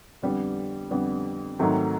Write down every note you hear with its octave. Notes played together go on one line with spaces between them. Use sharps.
F2 D3 G3 B3
F2 D3 G3 B3
G#2 D#3 F#3 A3 C4